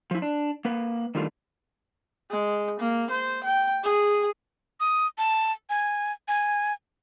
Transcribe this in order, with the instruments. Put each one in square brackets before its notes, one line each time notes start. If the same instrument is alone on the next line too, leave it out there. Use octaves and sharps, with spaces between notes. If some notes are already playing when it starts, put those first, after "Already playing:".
[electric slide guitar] F3 E4
D4
A#3 B4
D#3 E3 G3 A3 D4 F4
[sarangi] G#3
A#3
C5
G5
G#4
[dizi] D#6
A5
G#5
G#5